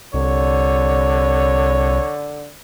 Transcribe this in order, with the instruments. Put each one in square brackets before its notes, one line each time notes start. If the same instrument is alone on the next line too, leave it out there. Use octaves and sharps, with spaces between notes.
[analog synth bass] C2 [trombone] D3 [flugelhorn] C#5